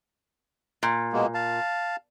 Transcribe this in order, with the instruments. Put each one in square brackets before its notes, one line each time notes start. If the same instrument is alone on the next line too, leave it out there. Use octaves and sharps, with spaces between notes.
[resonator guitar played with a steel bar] A#2
[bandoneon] B2 G#3 A#3
F5 A5